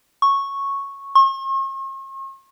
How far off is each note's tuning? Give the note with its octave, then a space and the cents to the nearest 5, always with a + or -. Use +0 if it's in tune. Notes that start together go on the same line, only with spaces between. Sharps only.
C#6 -5
C#6 -45